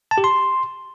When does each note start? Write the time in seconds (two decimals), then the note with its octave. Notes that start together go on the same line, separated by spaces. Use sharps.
0.11 A5
0.18 G4
0.24 C6